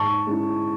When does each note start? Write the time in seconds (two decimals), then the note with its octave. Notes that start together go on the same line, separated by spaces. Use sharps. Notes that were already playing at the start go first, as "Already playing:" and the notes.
Already playing: G#2 A5 C#6
0.27 G#3 C#4 E4